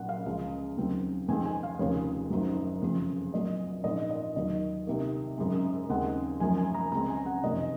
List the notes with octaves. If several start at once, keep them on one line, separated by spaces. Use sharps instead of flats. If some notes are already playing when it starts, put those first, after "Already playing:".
Already playing: A#1 A#2 F#3 A#3 F#5
F5
C#2 C#3 F3 G#3 F5
D#2 C#3 F#3 C4
F2 D#3 G#3 C4 G#5
G#5
F5
F1 D#2 C#3 F3 C#5
F#1 F#2 D#3 F#3
F1 F2 C#3 F3
A#1 A#2 F#3 D#5
A#1 G#2 F3 A#3 D#5
D#5
D#2 D#3 F#3 A#3 D#5
C2 C3 D#3 A#3
G#1 F#2 C#3 G#3
D#2 C#3 G#3 C4 F#5
G#1 F#2 F3 G#5
G#5
A#5
C#2 C#3 G#3 C4 A#5
G#5
F#5
F#1 F2 C3 D#3 D#5